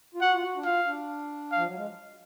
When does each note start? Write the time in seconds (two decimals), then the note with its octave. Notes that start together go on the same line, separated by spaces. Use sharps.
0.15 F4
0.21 F#4 F#5
0.34 F4
0.43 F#4
0.56 D4
0.65 F4 F5
0.86 D4
1.52 F3 F5
1.66 F#3
1.77 G#3